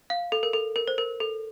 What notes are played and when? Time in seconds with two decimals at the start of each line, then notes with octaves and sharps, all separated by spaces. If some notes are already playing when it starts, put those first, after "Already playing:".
0.10 F5
0.32 A4
0.43 A#4
0.53 A4
0.76 A#4
0.88 C5
0.98 A#4
1.20 A4